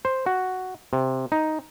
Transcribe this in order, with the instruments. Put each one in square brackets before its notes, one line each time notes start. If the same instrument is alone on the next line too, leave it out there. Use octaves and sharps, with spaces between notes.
[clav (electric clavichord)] C5
F#4
C3
D#4